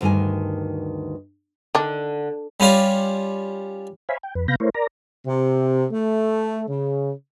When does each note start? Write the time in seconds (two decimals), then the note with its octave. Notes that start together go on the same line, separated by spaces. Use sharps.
0.01 D2 G2 D#3 A#4 G#5
1.75 D3 D#3 D4
2.60 G3 C#4 F4 D5
4.09 C5 C#5 E5 F5 G#5 B5
4.23 G5
4.35 F2 B4
4.48 C3 B3 F5 B5 G6 A#6
4.60 A3 E4 A#4 C5 C#5
4.75 A#4 D5 A#5
5.25 C3
5.91 A3
6.68 C#3